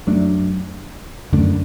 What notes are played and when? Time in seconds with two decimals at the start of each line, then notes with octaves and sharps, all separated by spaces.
0.07 F#2 F#3 A3 D4
1.32 F#2 D3 A3 D4